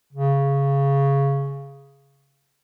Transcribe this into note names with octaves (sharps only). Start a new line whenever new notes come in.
C#3